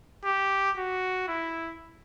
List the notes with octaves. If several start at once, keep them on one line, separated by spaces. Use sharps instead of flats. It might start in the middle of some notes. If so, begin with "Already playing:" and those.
G4
F#4
E4